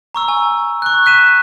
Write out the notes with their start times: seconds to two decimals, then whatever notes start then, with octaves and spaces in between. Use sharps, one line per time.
0.15 A#5 C#6 E6
0.28 G#5
0.82 C#6 F#6
1.06 F#6 B6 D#7 E7